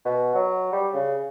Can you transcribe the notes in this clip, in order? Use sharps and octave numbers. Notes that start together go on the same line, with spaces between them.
B2
F#3
G3
C#3